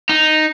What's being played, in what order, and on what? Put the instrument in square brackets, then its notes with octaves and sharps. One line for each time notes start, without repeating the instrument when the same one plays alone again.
[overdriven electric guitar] D#4